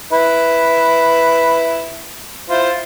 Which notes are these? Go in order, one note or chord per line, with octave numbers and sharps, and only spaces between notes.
E4 B4
E4 F4 C5